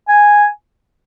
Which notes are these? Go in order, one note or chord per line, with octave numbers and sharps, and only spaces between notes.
G#5